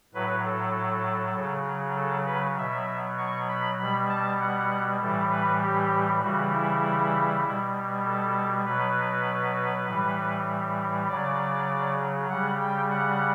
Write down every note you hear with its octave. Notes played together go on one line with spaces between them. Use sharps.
A2 F#3 B4
A4
C#3 F#3
A4
B4
B2 F#3 E5
C#6
B5
B2 G3 B5
A5
F#5
A2 E3 G3 A4
B4
G4
C#3 E3 G3 F#4
E4
B2 G3
A4
B2 F#3 B4
A2 E3 G3
C#3 F#3 D5
C#3 G3 F#5
G5
F#5